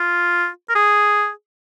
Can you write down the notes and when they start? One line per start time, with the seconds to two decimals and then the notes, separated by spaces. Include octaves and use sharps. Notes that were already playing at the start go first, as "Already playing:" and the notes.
Already playing: F4
0.69 A#4
0.75 G#4